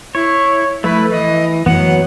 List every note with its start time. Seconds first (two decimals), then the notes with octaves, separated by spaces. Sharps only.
0.15 E4 C#5
0.84 F3 A3 E4 B4
1.11 E3 D#5
1.66 F#2 E3 F#3 A3 B3 F#5